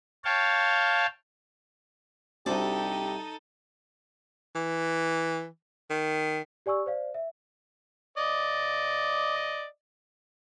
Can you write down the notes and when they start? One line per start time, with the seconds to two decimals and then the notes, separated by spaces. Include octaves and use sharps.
0.25 C#5 F5 G5 A5
2.46 C2 D4 D#4 F#4 G4 A4 C5 D5
4.55 E3
5.90 D#3
6.66 G4 D5 G#5 C#6 E6
6.86 C5 D5 F5
7.14 E5
8.18 D5 D#5